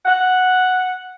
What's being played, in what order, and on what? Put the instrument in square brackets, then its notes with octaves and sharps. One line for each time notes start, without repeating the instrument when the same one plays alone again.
[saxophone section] F#5